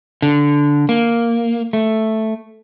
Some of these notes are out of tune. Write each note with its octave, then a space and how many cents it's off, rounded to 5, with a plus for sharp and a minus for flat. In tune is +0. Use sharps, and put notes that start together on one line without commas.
D3 -10
A#3 +0
A3 +0